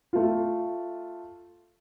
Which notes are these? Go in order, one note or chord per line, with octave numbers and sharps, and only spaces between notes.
A3 F4